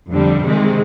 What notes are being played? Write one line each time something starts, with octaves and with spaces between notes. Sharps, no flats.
F2 D3 G3 C4
C3 D#3 G#3 C4